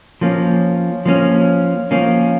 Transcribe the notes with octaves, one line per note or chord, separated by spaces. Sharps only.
F3 A#3 C#4
F3 A#3 C#4
F3 A#3 C#4